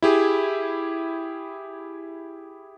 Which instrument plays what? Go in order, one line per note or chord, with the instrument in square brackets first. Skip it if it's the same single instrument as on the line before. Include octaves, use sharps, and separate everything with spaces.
[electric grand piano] E4 G4 G#4